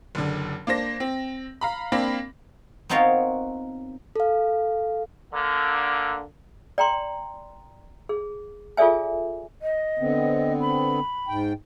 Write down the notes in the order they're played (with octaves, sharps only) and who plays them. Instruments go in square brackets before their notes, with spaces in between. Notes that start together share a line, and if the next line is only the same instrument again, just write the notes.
[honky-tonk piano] F#1 D3
A#3 D4 C5 A#6
C4
F5 A#5 B5
A#3 C4 D4 F5 B5 A#6
[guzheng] B3 C4 D#4 F4 A#4 C#5
[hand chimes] A4 F5
[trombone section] D3 A#3
[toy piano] D5 G5 A#5 C6
G#4
F4 G#4 A4 D5 E5 G#5
[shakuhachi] D#5
[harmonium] D3 B3 C4
[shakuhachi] B5
[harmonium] G#2 G5